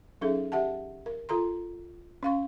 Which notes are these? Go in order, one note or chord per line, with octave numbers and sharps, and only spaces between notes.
F#3 C#4 D#4 G#4 A4 E5
G4 E5 F#5 A5
A#4
F4 A4 A#5 C6
C#4 F5 C#6